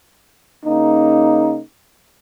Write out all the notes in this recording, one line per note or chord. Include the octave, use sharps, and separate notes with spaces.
C#3 A#3 D#4